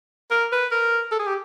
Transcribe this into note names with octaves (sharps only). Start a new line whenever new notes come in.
A#4
B4
A#4
A4
G#4
G4